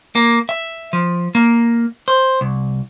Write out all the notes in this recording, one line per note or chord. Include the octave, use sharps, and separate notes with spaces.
A#3
E5
F3
A#3
C5
C2